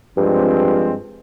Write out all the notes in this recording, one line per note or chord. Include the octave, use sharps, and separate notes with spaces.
G2 F3 G#3 C4